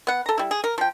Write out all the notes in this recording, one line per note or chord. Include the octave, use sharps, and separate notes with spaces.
B3 F#5
A4 A#5
G3 E4
G#4
A#4
F3 G5